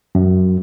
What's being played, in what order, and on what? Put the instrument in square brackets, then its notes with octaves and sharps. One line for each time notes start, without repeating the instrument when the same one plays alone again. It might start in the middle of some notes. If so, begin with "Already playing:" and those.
[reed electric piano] F#2